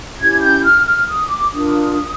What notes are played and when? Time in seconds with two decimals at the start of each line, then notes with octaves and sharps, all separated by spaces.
0.19 C#4 E4 G4 G#6
0.41 G6
0.64 F6
0.86 F6
1.07 D#6
1.30 D6
1.52 D4 F4 A#4 D#6